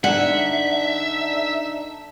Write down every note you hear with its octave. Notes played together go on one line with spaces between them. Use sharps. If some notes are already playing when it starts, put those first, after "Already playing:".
D3 D4 D#4 E5 F#5